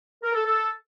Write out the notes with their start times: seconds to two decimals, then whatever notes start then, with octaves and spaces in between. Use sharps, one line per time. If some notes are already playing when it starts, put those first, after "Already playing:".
0.23 A#4
0.34 A4
0.45 A4